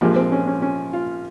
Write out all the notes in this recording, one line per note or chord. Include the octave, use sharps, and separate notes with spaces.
A#1 A#2 F3 G#3 G4
C4
C#4
C#4
C#4
F4